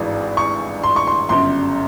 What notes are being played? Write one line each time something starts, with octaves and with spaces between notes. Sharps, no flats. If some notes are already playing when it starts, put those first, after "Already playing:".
Already playing: G#1 G2 E3 G#3
C#6
C6
C#6
C6
G1 F#2 C#3 C6